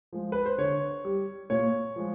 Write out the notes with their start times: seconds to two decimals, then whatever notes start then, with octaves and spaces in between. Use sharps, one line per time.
0.13 F3 G#3
0.32 B4
0.46 C5
0.58 D3 C#5
1.05 G3
1.50 A#2 C#5
1.96 F3 G#3